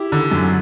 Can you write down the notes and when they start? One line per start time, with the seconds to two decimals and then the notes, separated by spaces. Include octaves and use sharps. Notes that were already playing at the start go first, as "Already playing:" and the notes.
Already playing: E4 G4
0.12 D3
0.31 F#2